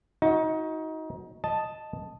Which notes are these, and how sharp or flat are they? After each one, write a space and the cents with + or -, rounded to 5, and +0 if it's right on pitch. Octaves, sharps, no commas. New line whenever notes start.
D#4 +25 F#4 -15
D#5 +0 A5 +0